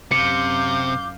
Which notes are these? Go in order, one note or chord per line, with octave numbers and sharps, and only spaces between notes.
F#2 C3 F5 D6 G6 C#7